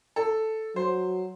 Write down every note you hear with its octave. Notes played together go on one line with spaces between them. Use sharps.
A4
F#3 C5